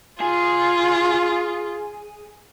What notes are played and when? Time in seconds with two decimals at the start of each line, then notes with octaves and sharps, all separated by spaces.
0.21 F4 G#4